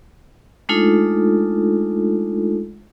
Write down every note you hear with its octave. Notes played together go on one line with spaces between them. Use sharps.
G#3 A3 D4 D#4 F4 A4